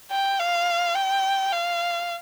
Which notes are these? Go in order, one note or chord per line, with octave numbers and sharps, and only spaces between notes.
G5
F5
G5
F5